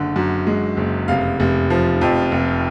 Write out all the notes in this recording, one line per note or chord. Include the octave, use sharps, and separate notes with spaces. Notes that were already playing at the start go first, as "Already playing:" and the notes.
Already playing: F#1 D3
F#2
G#3
F#1
F1 F5
F1
F3
F2
F1